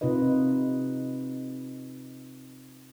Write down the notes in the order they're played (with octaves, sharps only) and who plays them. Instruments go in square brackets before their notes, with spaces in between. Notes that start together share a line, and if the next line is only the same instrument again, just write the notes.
[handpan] C3 D#4 F4 B4 D#5